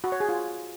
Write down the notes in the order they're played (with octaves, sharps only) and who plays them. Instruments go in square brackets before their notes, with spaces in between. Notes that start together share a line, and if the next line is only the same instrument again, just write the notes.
[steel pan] F#4
C#5
G#4
F4